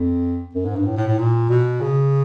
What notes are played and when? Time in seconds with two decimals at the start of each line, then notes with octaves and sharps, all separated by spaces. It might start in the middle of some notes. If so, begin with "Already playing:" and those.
Already playing: F2
0.55 F#2
0.65 G#2
0.76 G2
0.86 A2
0.97 A2
1.07 A2
1.18 A#2
1.49 B2
1.81 C#3